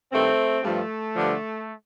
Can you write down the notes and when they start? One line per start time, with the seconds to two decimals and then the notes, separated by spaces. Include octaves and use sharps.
0.12 G2 D#3 A3 C4
0.63 G2 F3 A3
1.14 G2 D3 F3